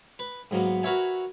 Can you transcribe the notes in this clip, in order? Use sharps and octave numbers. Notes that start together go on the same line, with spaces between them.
B4
G#2 F#3 A#3 B3
F#4 A#4 B4 C#5 E5 G#5